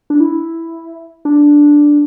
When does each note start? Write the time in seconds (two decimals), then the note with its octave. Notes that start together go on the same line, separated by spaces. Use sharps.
0.10 D4
0.20 E4
1.25 D4